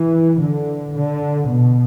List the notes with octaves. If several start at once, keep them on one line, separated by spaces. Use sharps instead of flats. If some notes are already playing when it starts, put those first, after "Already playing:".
Already playing: E3
D3
D3
B2